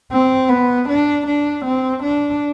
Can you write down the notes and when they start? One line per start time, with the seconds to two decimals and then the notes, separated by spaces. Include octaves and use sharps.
0.12 C4
0.50 B3
0.88 D4
1.26 D4
1.65 C4
2.03 D4